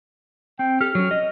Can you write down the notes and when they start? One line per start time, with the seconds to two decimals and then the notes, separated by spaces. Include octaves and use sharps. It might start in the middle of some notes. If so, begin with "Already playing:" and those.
0.59 C4 G5
0.81 G4 A4 F6
0.95 F#3 C#4
1.11 D#5